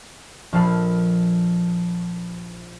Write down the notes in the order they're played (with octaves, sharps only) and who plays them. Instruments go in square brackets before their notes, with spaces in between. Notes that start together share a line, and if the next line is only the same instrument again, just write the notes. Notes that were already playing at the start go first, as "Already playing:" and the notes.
[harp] A#1 F3 A4 F5 A5 B5